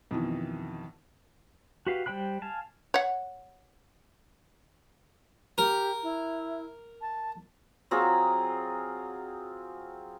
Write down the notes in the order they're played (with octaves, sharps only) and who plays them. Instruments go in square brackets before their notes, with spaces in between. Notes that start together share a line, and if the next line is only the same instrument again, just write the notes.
[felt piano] F2 B2 D#3 E3
[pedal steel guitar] F#4 G4 B4 F5
G3 C5 G5 B5 F#6
F5 G#5 A5
[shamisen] C#5 F#5
[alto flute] G4 [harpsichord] A#4
[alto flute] E4
A5
[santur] F#3 C4 F4 G#4